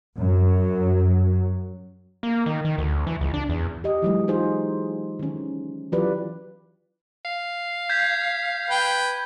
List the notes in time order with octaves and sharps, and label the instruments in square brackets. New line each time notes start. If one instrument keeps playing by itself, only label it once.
[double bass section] F#2 F#3
[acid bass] A#3
D#3
D#3
D2
E3
C#2
D4
E2
[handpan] G4 D#5
E3 F#3 G#3
D#4 F4 G4 G#4 C5
D#3 C#4
E3 F#3 F4 G4 B4 D5
[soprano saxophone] F5
[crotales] G6 G#6 B6
[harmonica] B4 G5